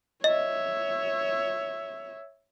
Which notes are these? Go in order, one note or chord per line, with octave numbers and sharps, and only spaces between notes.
C#5 D#5 E5